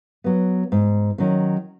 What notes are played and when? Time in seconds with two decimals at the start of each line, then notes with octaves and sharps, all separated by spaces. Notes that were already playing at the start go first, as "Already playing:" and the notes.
0.24 F#3 B3
0.72 G#2
1.18 D#3 F#3 C#4